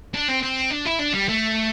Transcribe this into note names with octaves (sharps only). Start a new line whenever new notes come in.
D4
C4
C4
D4
E4
D4
G3
A3